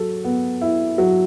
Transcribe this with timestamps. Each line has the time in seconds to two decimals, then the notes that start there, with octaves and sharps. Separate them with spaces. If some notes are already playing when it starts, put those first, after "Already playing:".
Already playing: F#3 A4
0.24 B3
0.61 E4
0.98 F#3